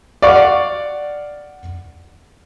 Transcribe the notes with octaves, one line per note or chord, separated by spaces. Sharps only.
D5 F5 F#5 C#6